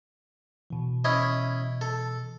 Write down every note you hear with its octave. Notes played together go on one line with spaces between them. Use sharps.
B2 E3
C#4 E4 D#5
A4